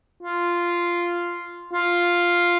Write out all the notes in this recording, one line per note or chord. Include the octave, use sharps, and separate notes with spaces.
F4
F4